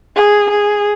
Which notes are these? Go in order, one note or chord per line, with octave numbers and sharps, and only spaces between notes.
G#4
G#4